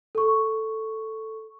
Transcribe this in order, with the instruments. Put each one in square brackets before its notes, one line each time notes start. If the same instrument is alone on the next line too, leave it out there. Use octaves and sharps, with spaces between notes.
[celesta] A4 C#6